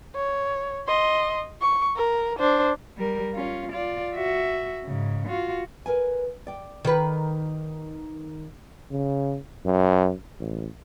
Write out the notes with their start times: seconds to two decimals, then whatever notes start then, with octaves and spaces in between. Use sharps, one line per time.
0.16 C#5
0.87 D#5 C6
1.61 C#6
1.97 A#4
2.39 D4 C5
2.97 G3 A#4
3.34 C#4 F4
3.71 F4 D5
4.14 F#4 E5
4.85 G#2 C#3
5.28 F4 F#4
5.86 A#4 B4 G#5
6.47 D5 G5
6.85 D#3 B4
8.91 C#3
9.65 F#2
10.40 A1